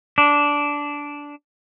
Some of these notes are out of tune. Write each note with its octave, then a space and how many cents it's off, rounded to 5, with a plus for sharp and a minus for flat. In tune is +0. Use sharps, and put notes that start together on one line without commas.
D4 -10